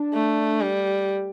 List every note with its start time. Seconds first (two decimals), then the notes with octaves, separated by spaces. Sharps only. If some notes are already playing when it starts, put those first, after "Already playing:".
Already playing: D4
0.14 A3
0.61 G3